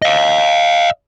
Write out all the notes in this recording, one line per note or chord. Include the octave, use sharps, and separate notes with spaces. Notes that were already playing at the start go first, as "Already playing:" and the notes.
D#5 F5